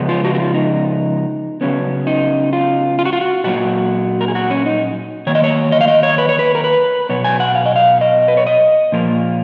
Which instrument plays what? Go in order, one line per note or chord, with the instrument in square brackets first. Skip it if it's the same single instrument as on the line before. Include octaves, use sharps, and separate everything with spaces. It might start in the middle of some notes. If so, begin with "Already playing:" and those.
Already playing: [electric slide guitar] C#3 F3 G#3 B3
F4
F#4
F#4
F4
D#4
C#3 F#3 B3 C#4
D#4
F4
F4
F#4
F4
F#4
A#2 F#3 A#3 F#4
A#4
G#4
F#4
C#4
D#4
D#3 F#3 A#3 C#5
D#5
C#5
D#5
F5
D#5
C#5
B4
C#5
B4
A#4
B4
B2 F#3 B3 C#5
G#5
F#5
F5
D#5
F5
D#5
B4
C#5
D#5
A#2 F3 A#3